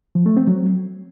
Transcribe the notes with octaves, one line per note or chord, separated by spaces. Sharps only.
F3
A3
C4
F#3